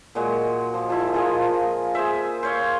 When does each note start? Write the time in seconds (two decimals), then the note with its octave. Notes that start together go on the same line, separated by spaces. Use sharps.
0.15 A#2 F#3 G#3 F#4
0.74 F3
0.90 F3 E4
1.14 F4 G#4 A#4 D#5
1.95 G#4 C5 E5
2.43 C5 C#5 F5